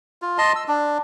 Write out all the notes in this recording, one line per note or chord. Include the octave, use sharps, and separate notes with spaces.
F4
D#5 A5 C6
E6
D4